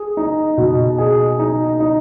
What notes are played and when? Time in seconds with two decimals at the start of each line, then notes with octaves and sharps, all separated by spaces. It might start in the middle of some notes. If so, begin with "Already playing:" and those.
Already playing: G#4
0.17 D#4
0.58 B2
0.98 G#4
1.39 D#4
1.80 D#4